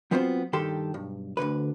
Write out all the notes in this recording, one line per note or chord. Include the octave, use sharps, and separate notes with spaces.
F#3 B3 C4 F4 B4 C5
G2 D#3 G4 A4 C6
B1 G2
D2 G#2 D3 B4